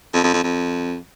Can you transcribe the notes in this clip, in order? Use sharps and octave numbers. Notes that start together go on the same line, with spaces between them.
F2
F2
F2
F2